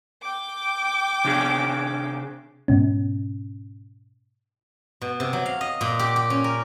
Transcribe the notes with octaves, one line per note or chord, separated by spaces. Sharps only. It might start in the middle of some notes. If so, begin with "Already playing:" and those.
G5 D6
C3 D4 G#4
G#2 B2 C#4
B2
C3
F#3
F5
D#5
A#2
G4
G4
C#4
A#4